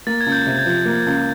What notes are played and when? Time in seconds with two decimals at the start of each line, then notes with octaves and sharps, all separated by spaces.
0.07 A#3 A6
0.21 G#6
0.26 C#2
0.32 G6
0.47 C3
0.59 G#6
0.66 F3
0.85 A#3
1.06 C#2